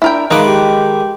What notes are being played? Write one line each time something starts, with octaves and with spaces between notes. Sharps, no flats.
D4 E4 A#4 G5
D#3 G#3 D#4 B4 F5 D6
G4